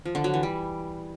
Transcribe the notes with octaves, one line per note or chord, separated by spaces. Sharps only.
F3
D3
F#3
E3
G3